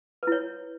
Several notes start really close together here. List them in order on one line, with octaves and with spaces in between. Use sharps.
B4 E4 C#5